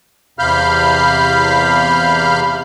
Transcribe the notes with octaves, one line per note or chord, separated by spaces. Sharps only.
E2 C3 F5 B5 F6 G6